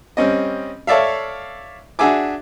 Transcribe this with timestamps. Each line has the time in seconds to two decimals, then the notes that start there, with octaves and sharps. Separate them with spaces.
0.17 G3 C4 C#4 D#5
0.87 A4 C#5 D5 E5 F5
1.99 D4 F#4 G#4 E5 G#5 D6